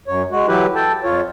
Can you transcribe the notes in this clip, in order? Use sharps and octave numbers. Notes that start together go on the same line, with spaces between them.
F#2 C#5
G#3 F#4
E3 F#3 E4 G4 B4
A4 G5 A5
F2 F4 C#5